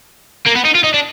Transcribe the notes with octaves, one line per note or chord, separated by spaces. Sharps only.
A#3
B3
D#4
F4
D#4
D4